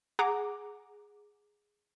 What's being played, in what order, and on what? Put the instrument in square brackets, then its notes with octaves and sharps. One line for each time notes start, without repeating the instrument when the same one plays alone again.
[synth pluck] G#4 F#5 A#5 D6